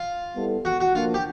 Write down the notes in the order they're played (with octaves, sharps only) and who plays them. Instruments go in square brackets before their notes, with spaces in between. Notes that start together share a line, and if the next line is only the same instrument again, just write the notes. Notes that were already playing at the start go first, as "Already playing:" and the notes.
Already playing: [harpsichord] F4
[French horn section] G3 B3 E4 A4
[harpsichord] F#4
F#4
[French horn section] F3 A#3 D4 [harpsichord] F4
[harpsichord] G4